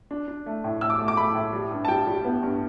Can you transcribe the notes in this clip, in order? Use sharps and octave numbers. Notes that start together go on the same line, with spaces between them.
D4
D4
A3
A2
A2 E6
D6
A3
D6
A3 B5
A2
G3
G2
A5
G3 G5
G3
B3
G2